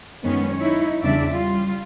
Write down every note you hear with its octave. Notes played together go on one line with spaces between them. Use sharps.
F#2 D#3 G#3 B3 C#4
D#4 E4 C#5
E2 C#3 G3 D4 D5 E5
G3 F4